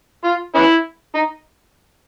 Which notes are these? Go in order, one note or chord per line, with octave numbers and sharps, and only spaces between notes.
F4
B3 C#4 E4
D#4